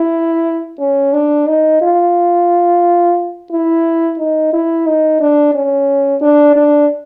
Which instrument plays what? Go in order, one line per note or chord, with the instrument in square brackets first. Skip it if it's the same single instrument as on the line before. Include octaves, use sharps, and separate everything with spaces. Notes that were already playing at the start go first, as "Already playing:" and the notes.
Already playing: [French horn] E4
C#4
D4
D#4
F4
E4
D#4
E4
D#4
D4
C#4
D4
D4